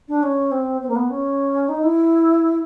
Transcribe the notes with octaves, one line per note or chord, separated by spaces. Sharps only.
D4
C#4
C4
C4
A#3
B3
C#4
D#4
E4